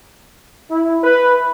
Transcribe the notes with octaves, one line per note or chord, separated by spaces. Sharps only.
E4
B4